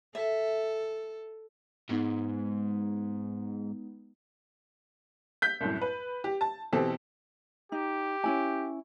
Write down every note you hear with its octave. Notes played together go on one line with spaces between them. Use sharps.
A4 E5
G#2 G#3 B3 D#4
G6 B6
C2 F#2 A2
B4
G4
A5
B2 E3 C4 G4 A4
D#4 G4
C#4 E4 G#5